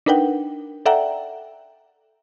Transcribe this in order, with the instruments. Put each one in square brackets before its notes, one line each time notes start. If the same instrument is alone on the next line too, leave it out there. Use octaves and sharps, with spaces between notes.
[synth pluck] D4 D#4 A#4 B4 F#5 G5
A4 D5 E5 F#5 G5 A#5